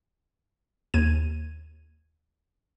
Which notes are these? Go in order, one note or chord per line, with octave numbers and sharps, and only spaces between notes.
D#2 G#6 D#7